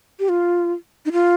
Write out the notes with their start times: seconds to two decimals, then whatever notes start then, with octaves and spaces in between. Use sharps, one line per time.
0.19 G4
0.29 F4
1.06 D#4
1.12 F4